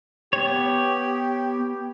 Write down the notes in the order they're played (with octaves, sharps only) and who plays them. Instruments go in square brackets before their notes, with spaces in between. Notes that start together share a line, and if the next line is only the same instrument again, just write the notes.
[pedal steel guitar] B3 C#5 [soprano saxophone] G4